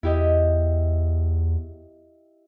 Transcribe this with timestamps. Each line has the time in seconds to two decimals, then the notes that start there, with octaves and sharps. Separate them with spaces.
0.03 E2 E4 G4 D#5